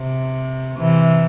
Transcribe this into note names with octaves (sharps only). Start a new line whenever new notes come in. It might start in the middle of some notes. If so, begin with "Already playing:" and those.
Already playing: C3
C3 E3